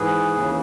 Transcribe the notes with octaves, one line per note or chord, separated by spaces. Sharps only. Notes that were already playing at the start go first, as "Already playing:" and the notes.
Already playing: G#2 E3 G#4 B4
D#2 C#3 E3